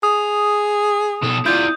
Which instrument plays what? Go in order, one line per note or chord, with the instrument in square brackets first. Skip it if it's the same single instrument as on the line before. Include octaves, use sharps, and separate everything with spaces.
[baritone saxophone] G#4 [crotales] D#6
[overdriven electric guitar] B2 A4
[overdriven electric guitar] E4 D5 [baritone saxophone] F4 [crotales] G6